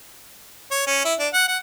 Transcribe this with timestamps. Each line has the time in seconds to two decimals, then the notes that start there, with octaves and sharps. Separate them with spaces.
0.71 C#5
0.87 C#4
1.05 E4
1.19 D4
1.33 F#5
1.48 F#5